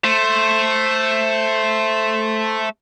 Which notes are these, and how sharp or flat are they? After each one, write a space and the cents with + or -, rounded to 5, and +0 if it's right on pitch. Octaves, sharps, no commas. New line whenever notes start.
A3 +0 C5 +10